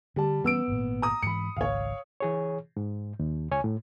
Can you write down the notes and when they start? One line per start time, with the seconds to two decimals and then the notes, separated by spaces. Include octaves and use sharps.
0.16 D3 G3 A5
0.44 E3 G3 B3 C#4 E6 D7
0.68 G#1 A#2
1.02 A#5 D#6
1.22 G#2 E3 B5 C#7
1.56 G#1 C#2 C#5 F5
2.20 E3 G#4 C#5
2.77 G#2
3.19 D#2
3.51 C#2 C#5 G#5
3.64 A2